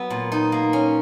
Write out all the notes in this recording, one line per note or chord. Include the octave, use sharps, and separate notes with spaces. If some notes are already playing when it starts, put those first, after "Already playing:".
Already playing: F#3 B3
A#2
D#4
A#3
C#4